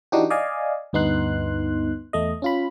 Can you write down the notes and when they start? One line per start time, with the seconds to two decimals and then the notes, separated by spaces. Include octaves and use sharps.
0.12 E3 D4 D#4 F#4 G4
0.30 D5 D#5 F5 G#5
0.93 D2 G2 B3 D#4 C6 F#6
2.13 E2 A3 D#5
2.42 C#4 F4 B5